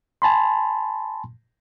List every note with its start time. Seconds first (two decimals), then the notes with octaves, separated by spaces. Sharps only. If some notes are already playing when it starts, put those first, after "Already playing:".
0.22 G#5 A5 B5 C6